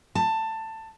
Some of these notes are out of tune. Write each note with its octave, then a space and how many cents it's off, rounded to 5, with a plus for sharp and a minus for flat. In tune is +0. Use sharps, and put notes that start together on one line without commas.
A5 +15